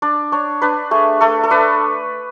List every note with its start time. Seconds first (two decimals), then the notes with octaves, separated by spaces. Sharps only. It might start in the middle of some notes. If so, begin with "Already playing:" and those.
0.02 D4 D5
0.32 D4 C#5
0.62 D4 B4
0.91 A3 G#4
1.21 A3 A4
1.43 A4
1.50 D4 B4